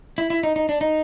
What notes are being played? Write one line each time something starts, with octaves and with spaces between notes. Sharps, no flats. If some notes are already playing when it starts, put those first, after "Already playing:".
E4
E4
D#4
D#4
D4
D#4